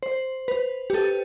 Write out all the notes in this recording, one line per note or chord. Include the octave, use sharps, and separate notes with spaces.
C5
B4
G4
A4